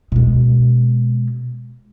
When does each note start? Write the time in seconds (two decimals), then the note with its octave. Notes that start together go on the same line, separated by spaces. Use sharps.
0.12 B2 G#3